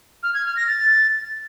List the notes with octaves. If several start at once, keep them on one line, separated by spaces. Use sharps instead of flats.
F6
G#6
F6
A#6
A6